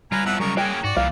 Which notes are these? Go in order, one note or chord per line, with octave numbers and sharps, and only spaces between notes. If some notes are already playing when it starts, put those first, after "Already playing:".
G3 F4 B4 F5 G#5 A#5
E2 F3 E5 F#5
F#2 C#3 G3 G#3 A#4 C#6
A#3 C#4 F#4 G#4 A#4 G5
G#2 F#4 D5
C2 A#2 E3 F5